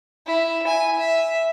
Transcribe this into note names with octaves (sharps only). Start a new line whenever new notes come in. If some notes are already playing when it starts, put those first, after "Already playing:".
E4
G#5
E5